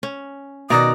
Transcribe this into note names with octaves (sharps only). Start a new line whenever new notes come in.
C#4
B2 D#3 F#4 D5 A#5 D#6